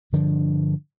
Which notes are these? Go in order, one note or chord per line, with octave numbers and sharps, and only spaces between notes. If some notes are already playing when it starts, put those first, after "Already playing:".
G2 D3 F3 D4